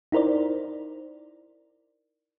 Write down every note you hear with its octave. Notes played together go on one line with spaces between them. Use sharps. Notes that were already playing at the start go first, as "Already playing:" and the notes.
D#4 E4 A#4 C5 D5